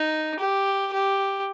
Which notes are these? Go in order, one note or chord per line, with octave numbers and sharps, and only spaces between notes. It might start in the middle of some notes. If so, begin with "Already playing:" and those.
Already playing: D#4
G4
G4